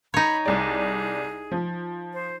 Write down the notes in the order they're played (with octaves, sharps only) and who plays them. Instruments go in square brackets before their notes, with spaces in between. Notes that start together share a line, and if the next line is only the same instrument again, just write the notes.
[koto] D#4 C#5 [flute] B5
[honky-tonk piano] C2 D5 [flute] G#4
[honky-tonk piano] F3
[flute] C5